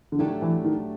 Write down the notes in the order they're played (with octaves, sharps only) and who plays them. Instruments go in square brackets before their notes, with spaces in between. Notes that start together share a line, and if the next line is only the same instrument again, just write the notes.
[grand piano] D3
[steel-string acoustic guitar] A2 F#3 A3 D4 G4 [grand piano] D#3
[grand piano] E3
D#3